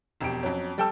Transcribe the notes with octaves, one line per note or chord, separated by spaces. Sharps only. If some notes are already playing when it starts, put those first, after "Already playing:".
E1 F2 G4 D7
F2 F#3 C#4
G3 A4 G5 A5 E6